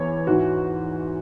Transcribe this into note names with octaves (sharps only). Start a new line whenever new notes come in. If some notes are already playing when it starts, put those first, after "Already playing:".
Already playing: E2 E3 C#5
G#2 E3 F#4